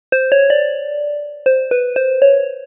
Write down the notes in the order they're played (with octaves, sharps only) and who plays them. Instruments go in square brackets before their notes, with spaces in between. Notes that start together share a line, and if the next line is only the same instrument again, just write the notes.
[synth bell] C5
C#5
D5
C5
B4
C5
C#5